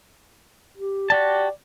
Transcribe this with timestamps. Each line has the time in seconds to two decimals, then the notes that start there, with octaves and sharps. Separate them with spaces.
0.77 G4
1.10 F#4 G4 D5 A5